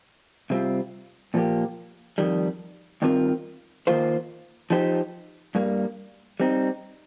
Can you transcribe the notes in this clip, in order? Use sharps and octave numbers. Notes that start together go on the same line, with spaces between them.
C3 G3 C4 F4
A#2 F3 A#3 G4
F2 D#3 G3
G2 D#3 C4 F4 A#4
D#3 A#3 F4 C5
F3 D#4 G4 C5
G2 G3 A#3
G3 C4 D#4